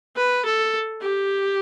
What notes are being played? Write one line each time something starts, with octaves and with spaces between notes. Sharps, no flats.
B4
A4
G4